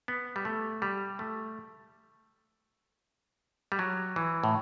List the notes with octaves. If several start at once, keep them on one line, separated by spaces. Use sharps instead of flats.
B3
G3
A3
G3
A3
G3
F#3
E3
A2